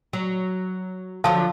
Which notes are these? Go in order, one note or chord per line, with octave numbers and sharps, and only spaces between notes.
F#3
D3 F3 F#3 F5 A5